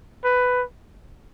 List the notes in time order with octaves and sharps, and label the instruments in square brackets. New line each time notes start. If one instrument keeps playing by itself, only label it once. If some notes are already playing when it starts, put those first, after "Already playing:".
[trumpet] B4